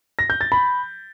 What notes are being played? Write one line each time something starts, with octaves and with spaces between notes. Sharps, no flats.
A#6
G6
A6
B5